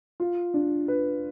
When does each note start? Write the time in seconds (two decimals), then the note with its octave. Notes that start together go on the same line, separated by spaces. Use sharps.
0.20 F4
0.54 D4
0.88 B4